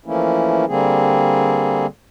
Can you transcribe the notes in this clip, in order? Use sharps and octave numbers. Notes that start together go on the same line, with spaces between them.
E3 F3 A3 A#3 C#4 E4
D3 G3 A#3 C4 G#4